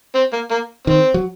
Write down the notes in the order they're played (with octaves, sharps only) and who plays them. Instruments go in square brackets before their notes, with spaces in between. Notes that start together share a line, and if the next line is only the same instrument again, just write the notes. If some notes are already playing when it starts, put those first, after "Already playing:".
[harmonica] C4
A#3
A#3
[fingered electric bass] D#3 [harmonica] C4
[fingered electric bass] F#3